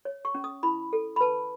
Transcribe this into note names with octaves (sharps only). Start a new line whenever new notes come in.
C#5
C#6
C#4
D#6
E4 B5
A4
B5
B4 A5